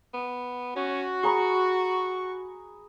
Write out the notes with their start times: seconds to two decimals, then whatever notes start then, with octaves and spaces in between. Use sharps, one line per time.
0.14 B3
0.76 C#4 F#4
1.23 G#4 A#5 B5 C#6